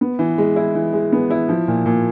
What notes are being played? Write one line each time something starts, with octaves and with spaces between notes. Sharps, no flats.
B3
E3
G#3
E4
E3
G#3
B3
E4
F3
A#2
A#2